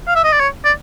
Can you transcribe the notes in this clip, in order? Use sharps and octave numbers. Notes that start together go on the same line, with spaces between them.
F5
E5
D#5
D5
C#5
D5